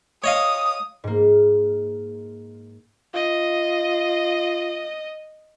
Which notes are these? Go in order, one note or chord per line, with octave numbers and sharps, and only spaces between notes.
C#5 D#5 F5 D#6
G#2 A#3
F4 D#5